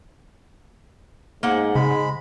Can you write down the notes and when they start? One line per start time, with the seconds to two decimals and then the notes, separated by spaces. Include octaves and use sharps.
1.43 G#2 A#3 F#5
1.75 C#3 G#3 B5